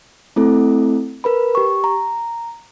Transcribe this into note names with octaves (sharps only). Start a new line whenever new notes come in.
A3 C4 E4 A4
A#4 B4 B5
G4 C#6
A#5